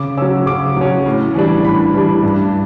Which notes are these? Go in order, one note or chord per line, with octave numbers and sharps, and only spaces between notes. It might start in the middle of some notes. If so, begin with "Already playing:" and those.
Already playing: C#3 D6
F#3 C#4 E6
C#3 D6
F#3 C#4
A2
E3 G3 D4
A2 B5
E3 G3 D4
G2